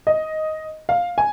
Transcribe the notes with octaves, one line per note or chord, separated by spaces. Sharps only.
D#5
F5
G#5